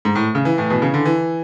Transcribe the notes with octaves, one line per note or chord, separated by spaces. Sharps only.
G#2
A2
C#3
E3
A2
B2
C#3
D3
E3